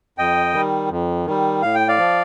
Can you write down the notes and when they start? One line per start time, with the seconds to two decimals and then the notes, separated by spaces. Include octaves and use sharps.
0.18 F2 D#5 G5
0.53 D#3 G3
0.90 F2
1.26 D#3 G3
1.62 A2 F5
1.75 G5
1.88 D5 F5
1.98 F3